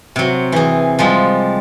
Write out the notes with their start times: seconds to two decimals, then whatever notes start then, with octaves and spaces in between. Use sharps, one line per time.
0.16 C3 F#3
0.52 E3 G#4
0.99 F3 G3 G#3